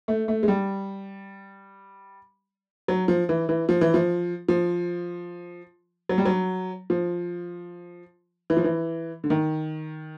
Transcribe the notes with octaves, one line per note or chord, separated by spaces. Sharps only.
A3
A3
G#3
G3
F#3
F3
E3
E3
F3
E3
F3
F3
F#3
G3
F#3
F3
E3
F3
E3
D3
D#3